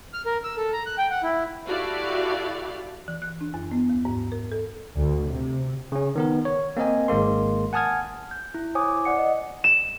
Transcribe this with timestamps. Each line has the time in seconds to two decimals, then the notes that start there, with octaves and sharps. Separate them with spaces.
0.13 F6
0.26 A#4
0.44 E6
0.57 A4
0.73 A#5
0.86 F#6
0.98 G5
1.10 F#5
1.23 E4
1.67 E4 F#4 G4 A4 D5 F5
3.08 E3
3.22 F#6
3.41 D4
3.54 F#2
3.71 B3
3.89 D#2
4.05 G#2
4.32 A#4
4.52 A4
4.96 D2
5.28 C3
5.92 C#3 C#4
6.16 D#3 B3 A#4
6.45 C#5
6.77 A#3 C4 A#4 D#5 G#5
7.08 G#1 G#3 A#3 C6
7.73 F#5 G#5 A5 D#6 F6 G#6
8.31 G6
8.54 E4
8.75 E4 C5 C#5 G#5 D6 D#6
9.05 D5 F#5 C#7
9.18 D#5
9.64 E7